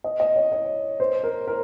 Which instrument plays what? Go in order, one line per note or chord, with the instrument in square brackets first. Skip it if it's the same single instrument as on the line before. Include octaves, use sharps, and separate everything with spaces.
[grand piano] D#5
D#5
C#5
C#5
C5
A#4
A#4